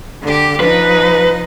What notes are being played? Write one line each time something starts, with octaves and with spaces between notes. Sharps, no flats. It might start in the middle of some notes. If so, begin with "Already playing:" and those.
D3 G4
F3 D#4 B4